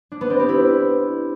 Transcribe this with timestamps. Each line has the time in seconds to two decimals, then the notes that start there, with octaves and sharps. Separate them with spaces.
0.12 D4
0.21 B3
0.30 C4
0.39 G4
0.49 E4